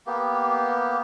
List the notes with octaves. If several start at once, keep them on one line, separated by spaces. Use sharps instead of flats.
A#3 B3 G4